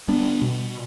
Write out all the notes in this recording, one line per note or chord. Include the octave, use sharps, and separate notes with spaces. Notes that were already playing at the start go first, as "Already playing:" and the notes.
G3 B3 D4
B2